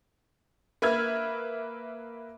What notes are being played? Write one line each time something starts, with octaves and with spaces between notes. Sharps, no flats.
A#3 B4 E5 F6 G#6